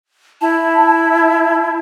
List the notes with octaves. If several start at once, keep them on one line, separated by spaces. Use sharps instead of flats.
E4 A5